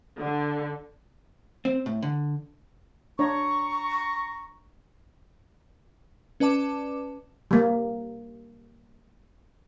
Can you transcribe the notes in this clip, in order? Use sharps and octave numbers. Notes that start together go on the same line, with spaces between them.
D3
C4
A2
D3
D4 C#5 A#5 C#6
C#4 B4 D5 A5 D6 E7
G3 A#3